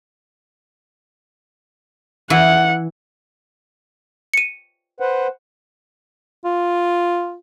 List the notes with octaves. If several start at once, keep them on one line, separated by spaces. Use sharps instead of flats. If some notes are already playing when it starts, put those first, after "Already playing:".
E3 F#5
C#7 D#7
B4 C5 F#5
F4